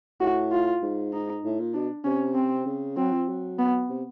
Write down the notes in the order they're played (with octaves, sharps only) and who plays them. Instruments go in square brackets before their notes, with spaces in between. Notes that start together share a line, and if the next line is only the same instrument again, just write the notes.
[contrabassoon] A2 [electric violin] F#4
[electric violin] F4
[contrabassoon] G#2
[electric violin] D#4
[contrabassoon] A2
A#2
[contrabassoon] B2 [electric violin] D4
[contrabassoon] C3 [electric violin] C#4
[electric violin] C4
[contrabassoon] C#3
[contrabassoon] F#3 [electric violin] C4
[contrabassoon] F3
F#3
[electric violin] B3
[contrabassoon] C3